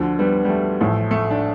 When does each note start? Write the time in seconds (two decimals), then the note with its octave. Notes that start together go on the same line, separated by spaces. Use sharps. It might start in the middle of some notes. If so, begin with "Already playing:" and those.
Already playing: D2 D3 F3
0.19 G3 B3
0.45 G3
0.49 A3
0.81 A1 A2 F3 A3
1.11 A3
1.31 D4